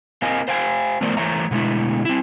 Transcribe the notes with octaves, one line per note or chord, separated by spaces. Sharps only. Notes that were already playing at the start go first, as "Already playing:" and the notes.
A#3 C4 A#4 D#5 F5 G#5
C5 F5 G5 G#5
F3 A3 B3 A#4 C5 D5
E3 A3 C5 C#5 E5 A#5
B2 D3 G#3 A3 E4
C4 E4